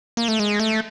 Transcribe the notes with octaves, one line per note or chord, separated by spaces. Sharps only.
A#3
A3
G#3
A3